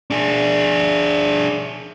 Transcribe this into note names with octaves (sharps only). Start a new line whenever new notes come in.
D4 G#4